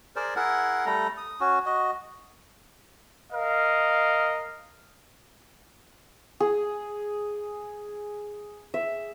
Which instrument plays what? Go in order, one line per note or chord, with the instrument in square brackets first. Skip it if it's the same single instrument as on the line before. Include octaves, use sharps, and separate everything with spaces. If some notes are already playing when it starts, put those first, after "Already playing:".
[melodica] G#4 A#4 C5 D5
E4 G#4 A#4 F#5
G3 A3 A4 A#5
D#6
C#4 F#4
F#4 D#5
[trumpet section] A#4 D#5 F5
[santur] G#4
E5